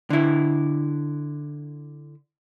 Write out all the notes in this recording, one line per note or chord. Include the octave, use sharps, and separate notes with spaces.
D3 E4